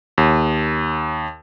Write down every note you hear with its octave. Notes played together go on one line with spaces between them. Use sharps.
D#2